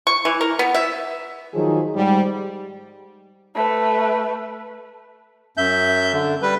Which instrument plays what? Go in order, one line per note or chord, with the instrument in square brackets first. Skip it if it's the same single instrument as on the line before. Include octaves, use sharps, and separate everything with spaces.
[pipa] C#6
E3
A#4
B3
E5
[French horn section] D#3 F3 F#3 D#4 G#4
G#2 G3
[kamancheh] A3 B4
[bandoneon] F#2 E5 G6
D3
G3 B4